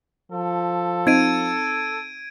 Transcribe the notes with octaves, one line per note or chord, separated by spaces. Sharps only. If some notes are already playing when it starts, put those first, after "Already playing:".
F3 A4
C4 D#4 G#6 D7 D#7